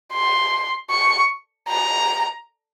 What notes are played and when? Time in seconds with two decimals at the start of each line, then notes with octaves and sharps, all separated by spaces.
0.13 C6
0.91 C#6
1.69 A#5